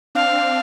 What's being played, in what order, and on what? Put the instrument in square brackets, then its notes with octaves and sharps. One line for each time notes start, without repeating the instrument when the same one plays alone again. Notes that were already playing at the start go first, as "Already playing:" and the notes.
[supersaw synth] C4 D4 [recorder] F5